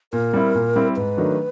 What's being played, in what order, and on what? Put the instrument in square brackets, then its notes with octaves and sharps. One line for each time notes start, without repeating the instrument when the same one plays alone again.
[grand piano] A#2 [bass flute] A#4
[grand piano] G3 C4 E4
A#2
G3 C4 E4
[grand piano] G#2 [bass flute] B4
[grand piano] D#3 F#3 A3 D4